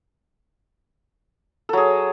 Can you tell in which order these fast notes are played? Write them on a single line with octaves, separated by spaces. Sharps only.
A4 F#3 G#4